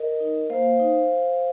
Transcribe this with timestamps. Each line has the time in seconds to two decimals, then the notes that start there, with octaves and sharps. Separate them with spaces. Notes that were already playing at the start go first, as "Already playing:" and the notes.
Already playing: A#4 D#5
0.20 D#4
0.50 A#3 C5 F5
0.80 D#4